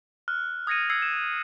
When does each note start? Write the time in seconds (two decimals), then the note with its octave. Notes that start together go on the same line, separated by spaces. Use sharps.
0.28 F6 F#6
0.67 D#6 G#6 A#6 C#7 D#7
0.89 E6 G#6 C7 C#7
1.02 E7